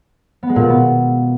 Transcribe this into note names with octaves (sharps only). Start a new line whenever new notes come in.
B3
G#3
A#2
B2
B3